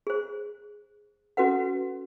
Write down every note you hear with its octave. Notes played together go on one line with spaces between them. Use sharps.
G#4 C5
C#4 F#4 A4 B4 F#5